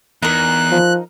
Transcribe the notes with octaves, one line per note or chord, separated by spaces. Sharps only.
E2 D#4 A#4 F#6
F3